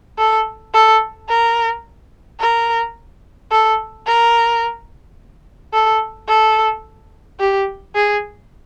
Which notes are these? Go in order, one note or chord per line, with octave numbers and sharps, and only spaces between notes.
A4
A4
A#4
A#4
A4
A#4
A4
A4
G4
G#4